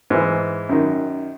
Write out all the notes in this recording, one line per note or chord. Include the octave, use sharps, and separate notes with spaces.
G#2 E3
F#2 D#3